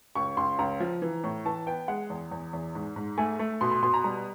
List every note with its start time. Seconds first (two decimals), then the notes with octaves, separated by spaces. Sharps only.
0.15 C#2 C#6
0.37 C#2 C6
0.59 C#2 A#5
0.80 F3
1.02 E3
1.24 A2
1.45 E3 A5
1.67 B3 G5
1.88 G#3 F#5
2.10 E2
2.31 E2
2.53 E2
2.75 G#2
2.96 G#2
3.18 A3 G#5
3.39 A3
3.61 B2 C6
3.71 C6
3.83 B2 C6
3.94 A#5
4.04 G3 A#5